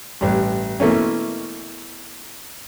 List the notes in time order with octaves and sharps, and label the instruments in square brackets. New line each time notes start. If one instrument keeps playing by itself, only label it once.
[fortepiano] A1 G2
B2 E3 A3 A#3 C#4